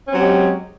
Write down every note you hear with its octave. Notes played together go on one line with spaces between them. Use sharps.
F#3 G#3 C4 C#4 G4